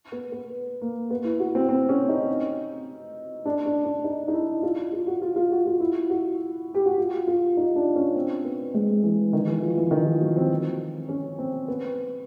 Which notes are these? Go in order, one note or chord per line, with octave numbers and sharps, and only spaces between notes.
B3
B3
A#3
B3
E4
F#4
C4
C4
C#4
D#4
D4
D4
D4
D#4
D#4
E4
F4
F4
F#4
F4
F4
F#4
F4
E4
F#4
G4
F#4
F4
F4
D#4
D4
C#4
C4
B3
G#3
E3
D#3
E3
F3
E3
D#3
F3
F#3
C4
C#4
C4
B3